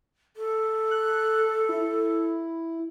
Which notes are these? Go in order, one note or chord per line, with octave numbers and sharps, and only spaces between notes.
A4
F#6
E4